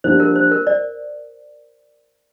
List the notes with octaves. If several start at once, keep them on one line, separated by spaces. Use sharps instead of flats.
F3 A#3 D4 G4 C5
A#4
C5
A#4
D5